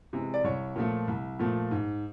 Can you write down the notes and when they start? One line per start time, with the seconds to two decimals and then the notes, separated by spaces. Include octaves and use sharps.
0.13 C3 E3 G#3
0.34 D5
0.44 C2 C#5
0.76 A#2 F3 A3
1.07 C2
1.39 A#2 F3 A3
1.71 G#2